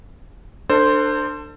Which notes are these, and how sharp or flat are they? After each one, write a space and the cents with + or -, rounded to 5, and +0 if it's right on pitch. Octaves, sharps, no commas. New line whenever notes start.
D4 +15 A4 +35 C5 +0